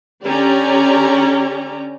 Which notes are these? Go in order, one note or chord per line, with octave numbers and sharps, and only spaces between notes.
D3 C#4 G4 D5 A#5